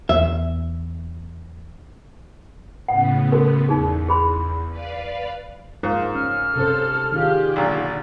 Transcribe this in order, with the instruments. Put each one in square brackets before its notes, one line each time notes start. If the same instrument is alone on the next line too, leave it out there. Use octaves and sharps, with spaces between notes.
[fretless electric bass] E2 [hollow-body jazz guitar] E5
[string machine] A2 C#3 B3 [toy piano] F#5
[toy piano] F#4 A4 A#4
[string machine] E2 [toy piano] D#4 G#4
[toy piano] G#4 B5 C6
[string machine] B4 D5 F5
[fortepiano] G#2 [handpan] F4 A#4 C5
[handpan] C#4 [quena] F6
[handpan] C3 C#4 C5 [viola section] A4
[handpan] D#3 D4 F4 [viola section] G4 G#4
[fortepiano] B1 A#2 D3